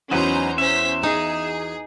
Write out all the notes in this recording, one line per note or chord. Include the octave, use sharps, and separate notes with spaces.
E2 F#3 C#4 D#4 F#4 B4 C5 A#5
C#4 C5 E5 B6
D#4 G#4